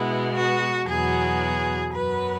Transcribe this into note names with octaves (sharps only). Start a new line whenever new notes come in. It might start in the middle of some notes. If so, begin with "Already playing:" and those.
Already playing: B2 G#3 B3 E4
F#4
E2 B2 F#3 B3 G#4
F#2 F#3 B3 B4